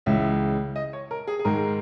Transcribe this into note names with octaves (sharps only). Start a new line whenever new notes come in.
C#2 C#3 E3 G#3 E5
D#5
C#5
A#4
G#4
G#4
G#2 D#3 G#3 A#4